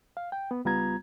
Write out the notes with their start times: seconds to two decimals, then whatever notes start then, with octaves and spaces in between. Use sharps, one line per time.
0.17 F5
0.32 G5
0.51 B3
0.65 C#2 G3 B3 F4 A#5 G#6